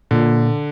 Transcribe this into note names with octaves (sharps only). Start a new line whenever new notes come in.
A#2 D3